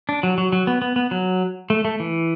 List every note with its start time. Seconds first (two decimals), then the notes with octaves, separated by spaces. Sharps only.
0.09 D4
0.23 F#3
0.38 F#3
0.52 F#3
0.67 B3
0.82 B3
0.96 B3
1.11 F#3
1.70 A3
1.85 A3
2.00 E3